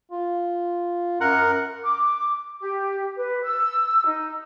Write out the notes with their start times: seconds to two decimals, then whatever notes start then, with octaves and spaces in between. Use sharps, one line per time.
0.12 F4
1.21 F#2 A#4 F#5
1.84 D6
2.60 G4
3.17 B4
3.43 E6
4.05 D#4